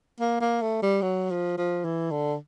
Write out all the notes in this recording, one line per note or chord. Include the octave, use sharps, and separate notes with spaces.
A#3
A#3
A3
G3
F#3
F3
F3
E3
D3